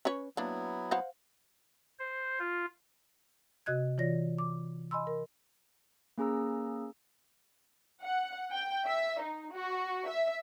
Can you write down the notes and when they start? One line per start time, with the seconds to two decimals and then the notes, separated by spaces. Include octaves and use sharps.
0.05 C#4 B4 C#5
0.37 F#3 A#3 B3 D4 E4
0.91 C5 F5 F#5
1.99 C5
2.39 F4
3.66 C3 F#4 D#5 F#6 G#6
3.98 E3 F4 C#5 D5 A#6
4.38 D6
4.91 D#5 G#5 B5 C6 E6
5.07 A#4
6.18 A#3 C#4 G#4 A#5 E6
8.02 F#5
8.51 G5
8.87 E5
9.21 D#4
9.53 F#4
10.08 E5